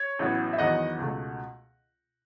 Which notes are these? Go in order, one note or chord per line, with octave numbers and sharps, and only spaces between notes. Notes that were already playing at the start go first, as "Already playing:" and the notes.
Already playing: C#5
A1 A2 F#3 B3
E5
E2 D#3 F#3 B3 D#5 F#5
C#2 B2 A3